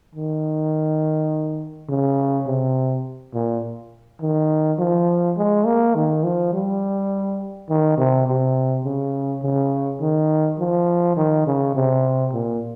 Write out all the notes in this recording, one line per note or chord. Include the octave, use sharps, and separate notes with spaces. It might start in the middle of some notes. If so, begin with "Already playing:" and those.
D#3
C#3
C3
A#2
D#3
F3
G#3
A#3
D#3
F3
G3
D#3
C3
C3
C#3
C#3
D#3
F3
D#3
C#3
C3
A#2